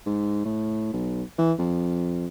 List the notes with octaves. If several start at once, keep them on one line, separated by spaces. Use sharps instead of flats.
G#2
A2
B1
E3
F2